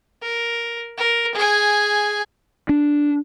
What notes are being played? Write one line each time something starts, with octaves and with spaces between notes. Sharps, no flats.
A#4
A#4
G#4 G#5
D4